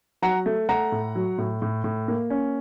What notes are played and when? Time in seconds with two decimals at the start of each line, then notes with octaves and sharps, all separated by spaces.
0.22 F#3 F#5 A#5
0.46 A3
0.69 A3 F#5 A#5
0.92 A2
1.15 F#3
1.38 A2
1.62 A2
1.84 A2
2.08 A#3
2.30 C#4